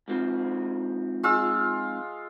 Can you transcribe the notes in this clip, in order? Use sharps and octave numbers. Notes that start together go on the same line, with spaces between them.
G#2 F3 C4
G#3 F4 E6